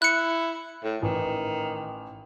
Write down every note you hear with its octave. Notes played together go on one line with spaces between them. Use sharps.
E4 F#6 C#7
A2
A1 D#3